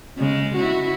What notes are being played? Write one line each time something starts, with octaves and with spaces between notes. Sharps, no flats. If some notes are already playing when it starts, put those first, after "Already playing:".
C#3 G#3
E4 F#4